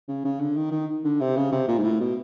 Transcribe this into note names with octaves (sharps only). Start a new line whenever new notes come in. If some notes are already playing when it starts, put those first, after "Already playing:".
C#3
C#3
D3
D#3
D#3
D3
C3
C#3
C3
A#2
G#2
A2
B2